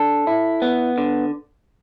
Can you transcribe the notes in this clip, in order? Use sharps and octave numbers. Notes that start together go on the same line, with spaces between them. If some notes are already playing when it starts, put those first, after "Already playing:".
Already playing: D4 A4
E4
B3
D3